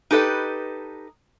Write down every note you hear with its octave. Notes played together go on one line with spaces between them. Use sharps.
D#4 G4 A4 B4 D#5